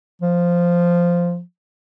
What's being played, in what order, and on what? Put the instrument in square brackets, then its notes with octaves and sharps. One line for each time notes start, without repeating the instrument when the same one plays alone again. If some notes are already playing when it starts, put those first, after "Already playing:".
[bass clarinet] F3